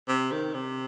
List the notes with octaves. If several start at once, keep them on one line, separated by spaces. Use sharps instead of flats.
C3
D#3
C3